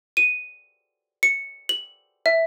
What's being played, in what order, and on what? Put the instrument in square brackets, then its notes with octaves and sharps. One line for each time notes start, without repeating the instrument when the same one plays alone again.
[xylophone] D#7
C#7
F#7
E5